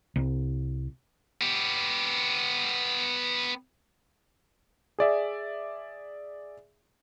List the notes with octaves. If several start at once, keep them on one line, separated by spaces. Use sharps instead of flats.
C2
B3 G4
G#4 D5 E5